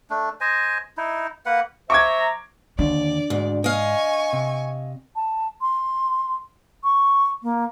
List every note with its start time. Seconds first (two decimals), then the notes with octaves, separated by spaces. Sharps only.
0.10 A3 D4
0.41 C5 D#5 G#5
0.97 D#4 E4
1.46 A#3 B4 F#5
1.90 C5 E5 A#5 C#6 D6 G#6
2.79 D#2 D3 D4 D5
3.30 D2 G#2
3.64 D#5 F5 G#5 C#6
4.33 C3
5.16 A5
5.61 C6
6.84 C#6
7.43 A#3